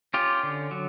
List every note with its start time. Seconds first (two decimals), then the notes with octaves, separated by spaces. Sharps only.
0.14 C#4 F4 G4
0.43 D3
0.71 F#3